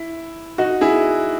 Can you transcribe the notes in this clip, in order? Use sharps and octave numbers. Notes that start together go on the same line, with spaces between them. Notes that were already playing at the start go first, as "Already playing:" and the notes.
Already playing: E4
D#4 F#4
E4 G#4